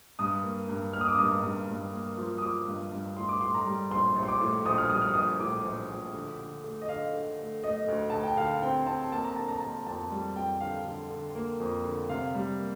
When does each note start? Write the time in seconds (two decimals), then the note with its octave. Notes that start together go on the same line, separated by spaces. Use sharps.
0.19 G2 D#6
0.44 A#3
0.68 G2
0.93 A#3 F6
1.01 D#6
1.08 D6
1.15 G2 D#6
1.43 G2
1.68 G2
1.93 A#3
2.18 F3
2.38 D#6
2.42 F3 D6
2.67 G2
2.92 G2
3.17 A2 C6
3.29 D6
3.41 A2 C6
3.54 A#5
3.66 G3
3.91 A#1 C6
4.16 A#1
4.23 C6
4.28 D6
4.41 A2
4.66 A#1 D#6
4.78 F6
4.89 G3 D#6
5.02 F6
5.13 A#1 D#6
5.40 A2 D6
5.64 A#1
5.90 A#1
6.14 D3
6.39 D3
6.64 A3
6.82 D#5
6.89 D3 F5
7.13 D3
7.38 A3
7.63 A3 D#5
7.88 D2
8.10 D2 A5
8.23 G5
8.37 D3 F5
8.62 C4 G5
8.87 C4 A5
9.12 A#3 A5
9.24 A#5
9.36 D3 A5
9.48 A#5
9.60 A#3 A5
9.86 F2 A5
10.11 G3
10.36 F2 G5
10.60 D3 F5
10.85 D3
11.10 D3
11.35 A#3
11.60 F2
11.85 D3
12.09 C3 F5
12.35 G3
12.59 A#3